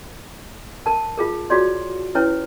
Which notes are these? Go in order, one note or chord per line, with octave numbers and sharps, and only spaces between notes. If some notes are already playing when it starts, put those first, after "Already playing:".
A#4 A5
F4 G#4 A#4
F4 F#4 G#4 C#5 D5 C6
C#4 E4 B4 C#5